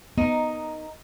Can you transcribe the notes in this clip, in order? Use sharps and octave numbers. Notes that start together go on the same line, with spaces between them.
B3 D#4 A#4 D#5